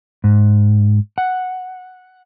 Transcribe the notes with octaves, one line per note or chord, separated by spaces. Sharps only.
G#2
F#5